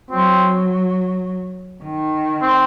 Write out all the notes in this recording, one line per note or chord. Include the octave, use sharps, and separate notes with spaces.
F#3 C4
D#3
C4